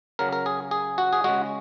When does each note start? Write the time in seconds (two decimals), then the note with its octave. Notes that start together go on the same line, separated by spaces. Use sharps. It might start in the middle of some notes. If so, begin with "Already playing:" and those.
0.19 C#3 F#3 A#4
0.33 A#4
0.46 G#4
0.71 G#4
0.98 F#4
1.13 G#4
1.24 C#3 G#3 F#4